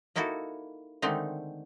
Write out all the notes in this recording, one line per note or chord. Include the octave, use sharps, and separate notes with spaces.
A#3 D#4 E4 F#4 A4
D3 D#3 G#3 A3 C4 D#4